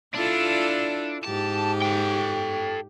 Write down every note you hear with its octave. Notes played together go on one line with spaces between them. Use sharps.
D4 E4 F4 A4
G#2 G4 A5
A4 G5